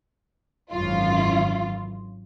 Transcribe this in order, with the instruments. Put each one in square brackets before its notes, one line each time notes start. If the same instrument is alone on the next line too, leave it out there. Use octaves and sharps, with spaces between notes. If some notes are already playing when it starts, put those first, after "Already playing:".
[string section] G#1 F#2 E3 F4